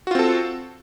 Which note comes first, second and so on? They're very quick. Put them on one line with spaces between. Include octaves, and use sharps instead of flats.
F#4 F4 C4 A4